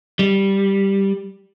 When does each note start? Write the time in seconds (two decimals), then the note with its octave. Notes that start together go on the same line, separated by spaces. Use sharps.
0.19 G3